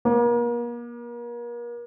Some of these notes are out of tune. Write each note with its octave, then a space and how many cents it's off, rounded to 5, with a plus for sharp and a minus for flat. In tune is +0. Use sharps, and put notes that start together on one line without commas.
A#3 +40